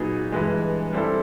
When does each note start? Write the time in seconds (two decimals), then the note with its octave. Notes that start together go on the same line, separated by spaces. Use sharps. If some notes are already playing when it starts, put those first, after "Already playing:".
Already playing: A#2 F#3 B3 D#4 G#4
0.32 G2 E3 G#3
0.93 G3 C4 E4 A4